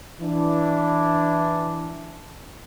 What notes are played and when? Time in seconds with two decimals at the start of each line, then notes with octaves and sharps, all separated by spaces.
0.21 E3 D4